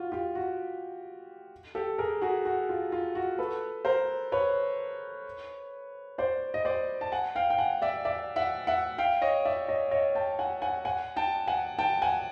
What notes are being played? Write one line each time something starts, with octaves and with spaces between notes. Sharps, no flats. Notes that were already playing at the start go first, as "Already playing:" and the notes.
Already playing: F4 F#4
F4 G4
F#4
G4 A4
G#4 A#4
F#4 G#4
F#4
F4
F4
F#4
A4 B4
A#4 C5
B4 C#5
C5 D5
D#5
C5 D5
A5
F#5 G#5
F5 G5
G5
F#5 G#5
D5 E5
D5 E5
E5 F#5
E5 F#5
F5 G5
C#5 D#5
D5 E5
C#5 D#5
C#5 D#5
G5 A5
F#5 G#5
F#5 G#5
F#5 G#5
G5 A5
F#5 G#5
G5 A5
F#5 G#5